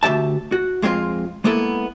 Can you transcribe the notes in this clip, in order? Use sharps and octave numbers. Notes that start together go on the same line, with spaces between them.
D2 G#3 G4 E5 A5
F#4
F2 G#3 C4 F4
G#3 A#3 B3 E4 A4